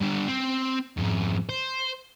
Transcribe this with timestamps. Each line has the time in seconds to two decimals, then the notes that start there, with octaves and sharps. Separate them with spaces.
0.01 G2 D3
0.28 C4
0.97 F2 G#2
1.49 C5